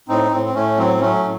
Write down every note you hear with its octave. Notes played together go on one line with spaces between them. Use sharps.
A2 C4 D#4
A2 C4
C4
A2 A3 C#4
F#3 C4
F#3 A3 C#4
A2